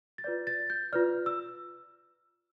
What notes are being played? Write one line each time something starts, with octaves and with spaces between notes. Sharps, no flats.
A6
F4 B4 D5 G6
A6
G6
F4 B4 D5 F6
E6